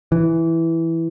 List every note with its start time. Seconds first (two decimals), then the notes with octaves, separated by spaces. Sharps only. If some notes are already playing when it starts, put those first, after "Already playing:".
0.12 E3